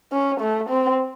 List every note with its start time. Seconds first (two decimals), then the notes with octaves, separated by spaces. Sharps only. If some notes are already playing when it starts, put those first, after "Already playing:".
0.12 C#4
0.40 A3
0.69 C4